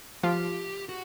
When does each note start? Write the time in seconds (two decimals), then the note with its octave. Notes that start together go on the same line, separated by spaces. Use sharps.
0.23 F3 F4 G4
0.89 F#4